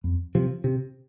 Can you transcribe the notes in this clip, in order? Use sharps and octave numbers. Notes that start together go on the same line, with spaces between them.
F2
C3 F3
C3